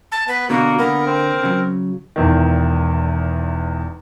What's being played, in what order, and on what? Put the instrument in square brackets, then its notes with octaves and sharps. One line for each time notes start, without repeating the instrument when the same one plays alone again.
[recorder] A5
[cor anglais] B3 [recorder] B4
[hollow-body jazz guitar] B2 D3 [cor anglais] A#3 [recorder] F#4
[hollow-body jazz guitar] D3 A#3 [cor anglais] B3 [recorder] A#4
[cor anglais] C4
[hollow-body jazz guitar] C#3 F#3
[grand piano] E1 E2 D#3